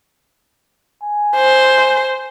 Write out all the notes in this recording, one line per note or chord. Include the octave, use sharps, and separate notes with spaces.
G#5
C5